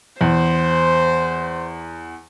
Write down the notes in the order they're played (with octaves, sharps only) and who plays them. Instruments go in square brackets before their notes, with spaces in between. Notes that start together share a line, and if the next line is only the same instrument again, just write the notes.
[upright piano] E2 [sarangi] C5